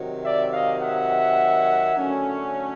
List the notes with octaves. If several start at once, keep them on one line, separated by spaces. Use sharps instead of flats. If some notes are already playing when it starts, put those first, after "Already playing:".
Already playing: C3 D#3 F#3
D5 E5
D#5 F5
E5 F#5
D3 F#3 A3 C#4